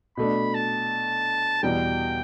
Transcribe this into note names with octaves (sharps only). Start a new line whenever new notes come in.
B2 A3 D4 B5
A5
E2 B2 G3 G5